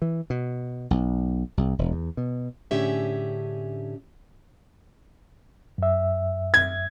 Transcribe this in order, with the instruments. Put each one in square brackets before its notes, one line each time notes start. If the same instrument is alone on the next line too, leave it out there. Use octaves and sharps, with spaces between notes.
[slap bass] E3
B2
B1
C2
E1
E2
B2
[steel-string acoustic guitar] A2 D3 C#4 G4 G#4 E5
[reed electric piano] F#2 E5
[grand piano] G#6